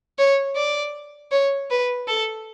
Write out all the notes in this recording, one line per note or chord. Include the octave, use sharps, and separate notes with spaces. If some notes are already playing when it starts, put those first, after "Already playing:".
C#5
D5
C#5
B4
A4